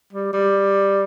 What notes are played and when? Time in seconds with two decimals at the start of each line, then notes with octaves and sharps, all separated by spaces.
0.13 G3
0.33 G3